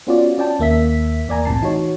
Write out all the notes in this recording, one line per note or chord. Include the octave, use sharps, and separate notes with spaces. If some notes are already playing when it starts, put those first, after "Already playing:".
B3 C#4 F4 F#4 D5
C#4 D5 G5 A5
D#2 A#3 E5 B6
E2 A#3 D5 G#5 A#5
C2 A2 C3 A5 C7
E3 D#4 F#4 C#5